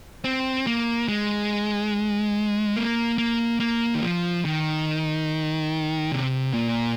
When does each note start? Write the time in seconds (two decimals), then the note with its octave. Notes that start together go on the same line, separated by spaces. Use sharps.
0.24 C4
0.67 A#3
1.08 G#3
2.77 A#3
3.18 A#3
3.60 A#3
3.95 D#3
4.02 F3
4.45 D#3
6.12 C3
6.54 A#2